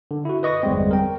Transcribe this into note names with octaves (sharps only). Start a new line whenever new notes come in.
D3
E4 F#4
B4 D#5 C#6 D#6 A#6
G1 E2 G3 G#3 B3 C4
A#4 G5